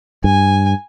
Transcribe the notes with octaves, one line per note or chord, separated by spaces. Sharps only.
G2 G#5